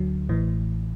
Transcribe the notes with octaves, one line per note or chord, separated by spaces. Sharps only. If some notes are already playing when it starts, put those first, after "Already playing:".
Already playing: D2 D3 F#3
A1 A2 E3